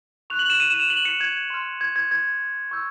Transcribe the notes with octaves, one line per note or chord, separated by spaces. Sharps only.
C#6 F#6 F7
F#7
E7
D#7
E7
F7
F#7
C#7
G#6
C6 F6
G#6
G#6
G#6
C#6 E6 G6